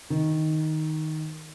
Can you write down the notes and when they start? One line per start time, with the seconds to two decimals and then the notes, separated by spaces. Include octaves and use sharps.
0.10 D#3